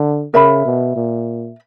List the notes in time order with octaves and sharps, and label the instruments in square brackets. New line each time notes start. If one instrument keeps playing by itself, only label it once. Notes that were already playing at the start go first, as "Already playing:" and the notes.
Already playing: [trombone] D3
[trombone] C#3 [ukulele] A#4 E5 B5
[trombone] B2
A#2